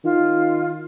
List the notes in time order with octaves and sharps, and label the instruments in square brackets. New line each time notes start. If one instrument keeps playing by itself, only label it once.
[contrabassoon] D#3 [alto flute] F4